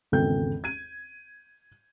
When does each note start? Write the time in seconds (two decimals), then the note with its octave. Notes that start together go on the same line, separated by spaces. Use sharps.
0.12 G#1 E2 C#3 A4 G5 G6
0.64 G#6 D#7